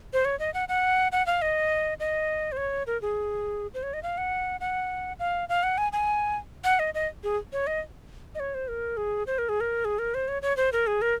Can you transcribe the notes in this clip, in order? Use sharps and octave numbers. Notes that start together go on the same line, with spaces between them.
C5
C#5
D#5
F#5
F#5
F#5
F5
D#5
D#5
C5
C#5
A#4
G#4
C5
C#5
D#5
F5
F#5
F#5
F5
F5
F#5
G#5
G#5
F#5
D#5
D#5
G#4
C#5
D#5
D#5
C#5
C5
A#4
G#4
C5
A#4
G#4
A#4
G#4
A#4
C5
C#5
C#5
C5
A#4
G#4
A#4